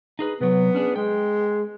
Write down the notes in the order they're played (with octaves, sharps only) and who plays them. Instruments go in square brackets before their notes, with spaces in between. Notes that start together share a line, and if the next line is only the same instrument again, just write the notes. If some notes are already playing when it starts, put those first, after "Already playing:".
[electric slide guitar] D#4 G#4 B4
[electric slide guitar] C3 F#3 [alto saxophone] B3
[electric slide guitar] C#4 D4 G#4
[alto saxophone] G#3 [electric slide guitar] G5